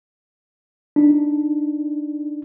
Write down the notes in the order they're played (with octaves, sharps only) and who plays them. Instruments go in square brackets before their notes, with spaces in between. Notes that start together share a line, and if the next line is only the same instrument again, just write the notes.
[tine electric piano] D4 D#4